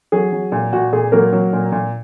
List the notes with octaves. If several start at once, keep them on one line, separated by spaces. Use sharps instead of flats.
F#3 G#4
F#3
A#2
A#2 F#4
A#2 G#4
F#3 A#3 A#4
F#3
A#2
A#2